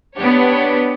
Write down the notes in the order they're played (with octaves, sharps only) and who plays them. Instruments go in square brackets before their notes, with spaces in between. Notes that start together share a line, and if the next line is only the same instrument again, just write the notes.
[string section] B3 D4 G4 C#5